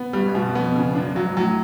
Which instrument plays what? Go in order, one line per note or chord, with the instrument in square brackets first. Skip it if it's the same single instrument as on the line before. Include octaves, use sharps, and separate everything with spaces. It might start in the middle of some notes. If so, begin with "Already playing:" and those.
Already playing: [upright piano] B3
[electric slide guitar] G2 [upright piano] G3
[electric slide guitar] G#2
[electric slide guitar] G2 [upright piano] B2
[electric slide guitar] F#2
[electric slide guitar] F2 [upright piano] B3
[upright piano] C#3
[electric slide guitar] F#2 [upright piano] D4
[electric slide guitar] G2 [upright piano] F#3
[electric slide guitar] G#2
[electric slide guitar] A2 [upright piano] F#3